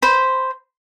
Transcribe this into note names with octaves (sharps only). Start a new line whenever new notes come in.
C5 B5